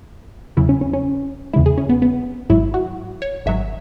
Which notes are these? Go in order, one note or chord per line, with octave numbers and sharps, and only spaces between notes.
E2 C#3 F#3 E4
C#4
C#4
C#4
E2 C#3 G#3 E4
G#4
C#4
B3
B3
G#1 G#2 F#3 E4
F#4
C#5
G#1 G#2 F#3 E5